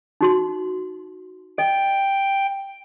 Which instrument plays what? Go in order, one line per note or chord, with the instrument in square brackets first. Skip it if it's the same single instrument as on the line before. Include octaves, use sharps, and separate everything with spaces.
[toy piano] D#4 F#4 C6
[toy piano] D#5 [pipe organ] G5